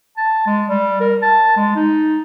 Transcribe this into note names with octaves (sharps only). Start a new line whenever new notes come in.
A5
G#3
G3
A#4
A5
G#3
D#4